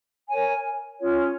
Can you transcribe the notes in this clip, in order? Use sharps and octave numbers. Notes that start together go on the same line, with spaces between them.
A#4 C#5 G#5
C#4 F4 G#4 C#5